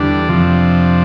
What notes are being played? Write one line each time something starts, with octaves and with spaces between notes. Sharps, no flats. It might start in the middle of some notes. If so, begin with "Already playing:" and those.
Already playing: E2 D3 G3 D4
F2 C3 F3